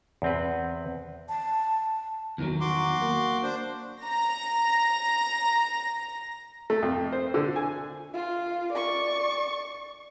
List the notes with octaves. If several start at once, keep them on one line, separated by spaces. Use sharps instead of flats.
E2 C4 B4
A5
E2 D#3 F#3
F#4 C6 D6
A#3
D4 C5
A#5 A#6
A3
F2
C5
D3
G#5
F4
D5 C#6